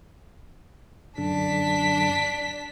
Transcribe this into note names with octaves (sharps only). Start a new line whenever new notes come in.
F#2 D3 D4 B6